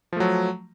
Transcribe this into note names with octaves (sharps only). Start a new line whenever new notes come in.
F3 F#3 A3